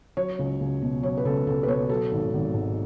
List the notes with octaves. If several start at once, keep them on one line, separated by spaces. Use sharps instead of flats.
F#3 C#5
C#2
C#2
B2
F#3 C#5
B4
C#2 A4
C#2 A4
B4
B2 C#5
F#3 A4
G#1
G#1
G#2